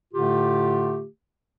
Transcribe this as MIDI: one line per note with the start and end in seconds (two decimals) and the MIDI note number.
0.14 1.04 45
0.14 1.04 50
0.14 1.04 57
0.14 1.04 65
0.14 1.04 67